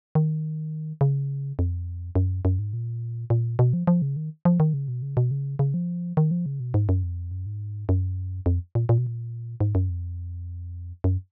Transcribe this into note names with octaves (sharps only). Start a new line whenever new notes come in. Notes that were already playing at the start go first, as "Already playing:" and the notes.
D#3
C#3
F2
F#2
F#2
G#2
A#2
A#2
B2
F3
F3
C#3
D#3
F3
D#3
C#3
B2
C#3
B2
C#3
C#3
F3
D#3
F3
C#3
B2
G#2
F#2
F2
F#2
G#2
F#2
F2
A#2
A#2
B2
A#2
G#2
F#2
F2
F#2